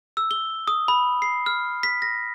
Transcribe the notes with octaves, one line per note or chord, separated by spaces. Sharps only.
E6
G7
D#6
B5
C7
F6
B6
A#6